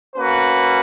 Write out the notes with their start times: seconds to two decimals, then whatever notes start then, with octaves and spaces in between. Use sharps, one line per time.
0.16 A#3 C#4 F#4 B4